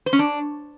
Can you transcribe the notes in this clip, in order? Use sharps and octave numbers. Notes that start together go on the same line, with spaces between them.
C5
C#4
D4